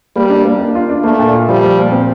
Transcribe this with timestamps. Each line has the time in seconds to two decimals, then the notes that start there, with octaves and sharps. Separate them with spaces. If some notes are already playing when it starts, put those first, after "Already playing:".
0.16 G3 A#3
0.30 D4
0.45 A#3
0.59 D4
0.75 F4
0.89 D4
1.04 A3 A#3
1.19 A#2
1.34 F4
1.49 F3 G3
1.64 F3
1.78 A#2
1.92 C4